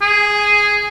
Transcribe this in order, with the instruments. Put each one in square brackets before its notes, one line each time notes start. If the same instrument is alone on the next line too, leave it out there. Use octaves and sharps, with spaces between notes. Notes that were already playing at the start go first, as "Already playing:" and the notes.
[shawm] G#4